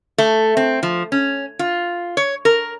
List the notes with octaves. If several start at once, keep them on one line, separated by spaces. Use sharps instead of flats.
A3
C4
F3
C#4
F4
C#5
A#4